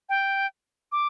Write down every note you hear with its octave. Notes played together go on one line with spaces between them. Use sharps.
G5
D6